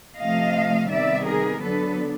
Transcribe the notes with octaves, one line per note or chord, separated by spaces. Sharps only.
C3 F3 A3 D#5 F5
C3 D#3 G3 B3 D5 E5
G#4 A#4
D3 F#3 B3 D4 A4 B4